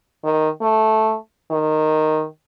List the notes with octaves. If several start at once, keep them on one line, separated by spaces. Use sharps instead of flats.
D#3
A3
D#3